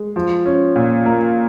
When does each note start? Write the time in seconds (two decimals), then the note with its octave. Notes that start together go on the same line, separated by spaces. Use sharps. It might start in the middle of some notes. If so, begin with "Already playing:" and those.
Already playing: G#3
0.16 F3
0.46 C#4
0.76 A#2
1.06 A#3